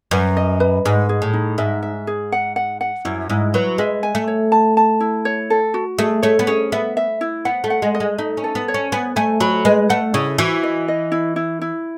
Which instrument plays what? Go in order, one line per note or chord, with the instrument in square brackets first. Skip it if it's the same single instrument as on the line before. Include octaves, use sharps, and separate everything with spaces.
[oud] F#2 [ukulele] B4
[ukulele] D#5
B4
[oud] G#2 [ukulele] G#4
[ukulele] G#4
[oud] A2
[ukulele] D#4
[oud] G#2 [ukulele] E5
[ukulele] E5
G#4
F#5
F#5
F#5
[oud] F#2 [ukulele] E4
[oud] G#2 [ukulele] E4
[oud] F#3 [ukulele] B4
[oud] G#3 [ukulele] E5
[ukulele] G#5
[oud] A3
[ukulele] C#5
A5
A5
E4
C#5
A4
F#4
[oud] A3 [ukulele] G#4
[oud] A3 [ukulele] C#5
[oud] B3
[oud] C#4 [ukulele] G#4
[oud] B3 [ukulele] E5
[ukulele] E5
E4
[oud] B3 [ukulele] F#5
[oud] A3
[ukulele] F#5
[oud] G#3
[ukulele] D#5
[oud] G#3
[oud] A3 [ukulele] D#4
[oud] C#4
[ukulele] A4
[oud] B3
[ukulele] C#5
[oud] C#4
[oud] B3 [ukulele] G#5
[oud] A3 [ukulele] G#5
[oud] F#3 [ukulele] B5
[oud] G#3 [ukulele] B4
[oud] A3 [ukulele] F#5
[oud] C#3 [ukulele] E4
[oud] E3 [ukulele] F#4
[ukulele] D#5
D#5
E4
E4
E4